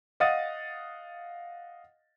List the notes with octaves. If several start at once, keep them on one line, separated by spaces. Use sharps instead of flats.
D#5 F5 F#5 D#6 A6 D#7